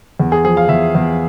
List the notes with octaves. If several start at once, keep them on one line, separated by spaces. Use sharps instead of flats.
E2
G#4
F3 G#4
F5
E2 E5
E2